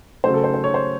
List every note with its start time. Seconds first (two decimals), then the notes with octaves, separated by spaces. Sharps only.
0.24 C#3 F#3 A3 C5
0.34 A4
0.44 C5
0.54 C5
0.64 C#5
0.74 C5